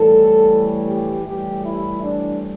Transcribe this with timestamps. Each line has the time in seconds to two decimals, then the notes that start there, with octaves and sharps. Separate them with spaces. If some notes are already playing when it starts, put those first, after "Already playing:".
Already playing: A2 E3 G3 A4
0.89 G4
1.27 A2 E3 G3 G4
1.65 E4
2.03 D4